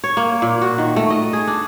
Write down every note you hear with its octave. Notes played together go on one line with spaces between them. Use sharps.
C#5
A#3
A#2
F#4
D#3
A3
D#5
G#4
D4